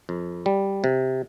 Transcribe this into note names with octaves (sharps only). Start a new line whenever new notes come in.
F2
G3
C3